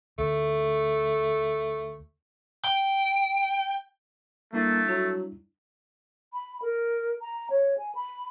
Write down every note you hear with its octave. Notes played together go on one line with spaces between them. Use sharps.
D2 A3
G5
G3 A3 A#3 D4 E4
F#3
B5
A#4
A#5
C#5
G#5
B5